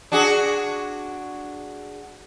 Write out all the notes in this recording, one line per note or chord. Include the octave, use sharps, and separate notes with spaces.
D4 F#4 G#4